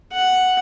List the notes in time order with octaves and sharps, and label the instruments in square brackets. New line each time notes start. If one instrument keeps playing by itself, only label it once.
[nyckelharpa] F#5